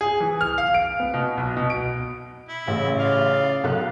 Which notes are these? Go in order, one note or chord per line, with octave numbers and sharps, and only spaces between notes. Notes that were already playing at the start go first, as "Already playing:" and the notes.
G#4
E3
F6
F5
D7
B3
B2
B1
B2
D7
E4
A1 C#3
F4 D5 F5
B1 A4 F#6